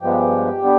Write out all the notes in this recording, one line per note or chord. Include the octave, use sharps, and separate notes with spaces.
G2 F3 G#3 B3 G4
D3 G3 B3